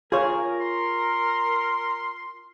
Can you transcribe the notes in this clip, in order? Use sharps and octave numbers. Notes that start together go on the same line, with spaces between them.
F4 G#4 A#4 C#5
C6